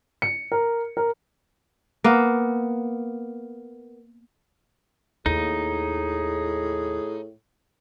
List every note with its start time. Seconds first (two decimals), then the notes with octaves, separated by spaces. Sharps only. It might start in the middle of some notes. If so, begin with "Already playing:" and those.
0.22 C#7
0.52 A#4
0.97 A#4
2.04 A#3 B3
5.26 D#2 A2 D#4 G#4